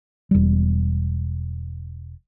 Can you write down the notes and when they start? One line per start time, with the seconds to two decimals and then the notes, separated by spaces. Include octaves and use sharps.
0.31 E1 G3